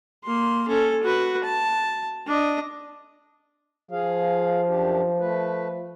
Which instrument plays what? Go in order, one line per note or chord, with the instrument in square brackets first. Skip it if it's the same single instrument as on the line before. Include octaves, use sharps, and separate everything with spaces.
[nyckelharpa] A#3 C6
C#4 A4
F#4 B4
A5
D4 D#5
[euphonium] F3 [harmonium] G#4 F5
[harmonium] F#2 D4 G4
A3 B4